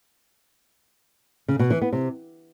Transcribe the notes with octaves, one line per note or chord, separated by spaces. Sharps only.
C#3
B2
E3
B3
C3